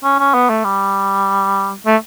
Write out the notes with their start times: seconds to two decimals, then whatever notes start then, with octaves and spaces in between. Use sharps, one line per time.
0.04 C#4
0.19 C#4
0.34 B3
0.49 A3
0.64 G3
1.86 A3